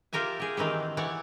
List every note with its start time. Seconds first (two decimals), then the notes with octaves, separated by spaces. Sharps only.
0.13 F4 G4 A#4 E5 G#5
0.40 G4 G#4
0.57 D#3 E3 C4 G4
0.97 E3 C#5 D5 F#5